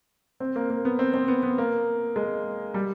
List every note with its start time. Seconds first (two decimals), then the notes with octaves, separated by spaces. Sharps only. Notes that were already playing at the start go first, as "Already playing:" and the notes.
0.40 C4
0.56 A#3
0.70 A#3
0.85 B3
0.99 C4
1.14 C4
1.28 B3
1.43 B3
1.58 A#3
2.16 G#3
2.74 G3